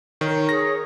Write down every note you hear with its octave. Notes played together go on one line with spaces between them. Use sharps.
D#3 A#4 C#5
G#4 A#6